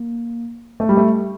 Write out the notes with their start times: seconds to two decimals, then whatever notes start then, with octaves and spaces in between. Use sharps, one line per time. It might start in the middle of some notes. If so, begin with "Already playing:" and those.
Already playing: A#3
0.80 A3
0.89 G3
0.97 A3